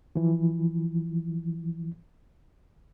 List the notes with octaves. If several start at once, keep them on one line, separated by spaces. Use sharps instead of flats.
E3 F3